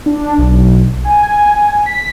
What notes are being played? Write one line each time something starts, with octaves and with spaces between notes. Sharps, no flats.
D4
B1
G#5
B6